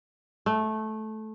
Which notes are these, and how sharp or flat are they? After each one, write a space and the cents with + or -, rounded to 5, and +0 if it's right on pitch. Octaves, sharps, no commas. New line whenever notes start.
A3 -15